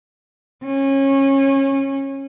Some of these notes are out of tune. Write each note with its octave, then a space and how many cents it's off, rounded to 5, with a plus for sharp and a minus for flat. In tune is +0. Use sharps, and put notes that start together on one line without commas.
C#4 -25